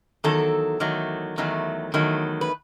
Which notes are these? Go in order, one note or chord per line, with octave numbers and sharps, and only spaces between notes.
E2 D#3 F#3 A4
E2 D#3 F#3 A3
E2 D#3 F#3 A3
E2 D#3 F#3 A3
B4